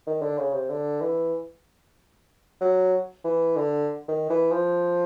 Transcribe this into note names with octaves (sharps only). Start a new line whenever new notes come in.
D#3
D3
C#3
C3
D3
E3
F#3
E3
D3
D#3
E3
F3